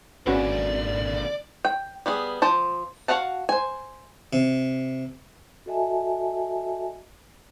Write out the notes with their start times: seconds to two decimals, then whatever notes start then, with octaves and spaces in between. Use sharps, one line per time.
0.27 G#1 D3 A#3 C#4 F#4 B4 D5
1.65 G5
2.06 G3 B3 G#4
2.42 F3 C5 A5
3.08 F#4 B4 F5 F#5 A5
3.49 C5 G#5
4.33 C3
5.66 F#4 A4 D#5 E5 G#5 A5